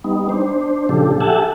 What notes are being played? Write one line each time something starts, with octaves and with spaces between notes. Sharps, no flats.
G3 B3 D#4
D4 C5
A#2 C#3 F3 D4 G4 A4
G4 A4 E5 F#5 G#5 A5